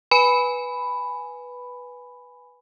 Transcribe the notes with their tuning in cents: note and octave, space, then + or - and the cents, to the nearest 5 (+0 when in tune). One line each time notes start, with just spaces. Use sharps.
B4 -5 G#5 +0 B5 +5